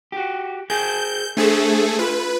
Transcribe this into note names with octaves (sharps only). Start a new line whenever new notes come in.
F#4 G4
G#4 A#4 G#5 G6
A3 D4 G#4 A4 C5
F4 B4 B5